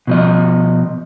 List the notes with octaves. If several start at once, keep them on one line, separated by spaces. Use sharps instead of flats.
B2 F3 D#5